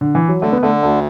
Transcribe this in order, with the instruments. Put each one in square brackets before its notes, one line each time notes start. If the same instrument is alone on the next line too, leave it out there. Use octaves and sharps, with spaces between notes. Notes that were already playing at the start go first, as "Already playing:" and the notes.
[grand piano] D3
E3
F#3
[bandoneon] D3 [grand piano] A3
[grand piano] B3
[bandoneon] D3 [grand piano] A3
[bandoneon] D2 [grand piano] A3